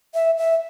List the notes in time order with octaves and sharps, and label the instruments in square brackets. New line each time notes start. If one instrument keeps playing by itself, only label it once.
[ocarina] E5
E5